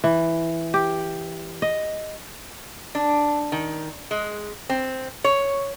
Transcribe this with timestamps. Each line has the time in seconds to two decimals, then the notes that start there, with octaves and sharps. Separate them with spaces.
0.04 E3
0.74 G4
1.62 D#5
2.95 D4
3.52 D#3
4.11 G#3
4.69 C4
5.24 C#5